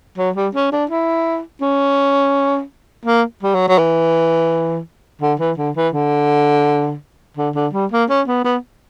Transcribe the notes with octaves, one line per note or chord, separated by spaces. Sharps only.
F#3
G3
C#4
D4
E4
C#4
A#3
G3
F#3
F#3
E3
D3
E3
D3
E3
D3
D3
D3
G3
A#3
C#4
B3
B3